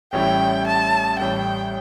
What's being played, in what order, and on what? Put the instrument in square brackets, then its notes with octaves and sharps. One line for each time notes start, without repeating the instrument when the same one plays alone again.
[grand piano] A1 A2 G3 C#4 E4 [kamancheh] G5
[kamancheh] A5
[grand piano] A1 A2 G3 [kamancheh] G5